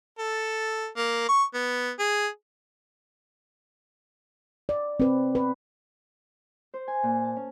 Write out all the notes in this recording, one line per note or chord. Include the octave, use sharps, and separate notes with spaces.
A4
A#3
C#6
B3
G#4
D5
C4 B4
B4
C5
G#5
A#2
A5
C#4